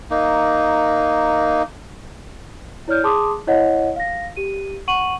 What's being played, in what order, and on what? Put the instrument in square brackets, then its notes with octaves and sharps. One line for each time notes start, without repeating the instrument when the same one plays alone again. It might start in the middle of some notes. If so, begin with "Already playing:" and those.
[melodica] A#3 D#4
[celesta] E4 C#5 D5 F6 G6
G#4 A5 C6 D6 D#6
E4 C#5 D#5 F#5
F5 A#6
G4 D#7
F#5 C#6 D#7 F#7